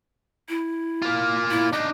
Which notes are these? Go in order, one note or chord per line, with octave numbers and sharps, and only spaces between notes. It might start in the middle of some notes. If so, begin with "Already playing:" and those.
E4
A#3 F4
E4
D4 D#4 D#5